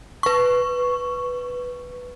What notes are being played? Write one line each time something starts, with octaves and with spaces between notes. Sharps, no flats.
B4 C#6